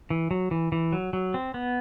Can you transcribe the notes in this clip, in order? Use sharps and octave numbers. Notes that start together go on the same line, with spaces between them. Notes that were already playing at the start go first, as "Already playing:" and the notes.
E3
F#3
E3
E3
F#3
F#3
C4
B3